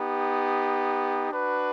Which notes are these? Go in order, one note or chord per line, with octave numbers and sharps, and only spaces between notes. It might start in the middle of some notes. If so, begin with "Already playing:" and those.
Already playing: B3 D#4 G4
D4 F#4 B4